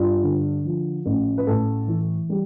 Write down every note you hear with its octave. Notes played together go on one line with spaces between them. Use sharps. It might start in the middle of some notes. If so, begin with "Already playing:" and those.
Already playing: G2 F4
D3
F3
A1
B4
A2 A4
E3
G3